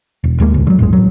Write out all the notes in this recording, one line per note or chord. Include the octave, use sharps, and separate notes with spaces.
E1
D#2 G#3 A#3
E1 C#2 G2
D3 F#3
A1 E2 G#2 G#3
A1 F#3